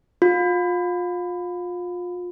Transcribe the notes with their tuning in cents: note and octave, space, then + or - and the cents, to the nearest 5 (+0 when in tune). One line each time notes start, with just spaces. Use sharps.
F4 +30